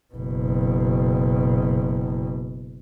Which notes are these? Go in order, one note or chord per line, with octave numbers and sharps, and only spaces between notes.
F#1 B2